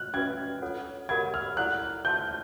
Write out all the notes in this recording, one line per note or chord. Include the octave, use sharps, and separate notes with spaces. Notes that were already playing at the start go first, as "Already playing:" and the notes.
Already playing: F6 F#6
C#4 F#4 B4 E5 G#6
F4 A4 C#5 F#5
G4 A#4 C#5 F#5 B5 G#6
F6
E4 A4 D5 F#5 A#5 F#6
C5 E5 A5 C6 G6